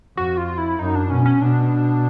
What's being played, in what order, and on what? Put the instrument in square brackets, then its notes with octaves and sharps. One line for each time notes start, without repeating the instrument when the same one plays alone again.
[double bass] F2 [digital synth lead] F#4
[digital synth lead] F4
E4
[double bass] F#2 [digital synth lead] D#4
[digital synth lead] D4
[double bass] B2 [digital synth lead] C#4
[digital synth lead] C#4
[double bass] B2 [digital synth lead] D4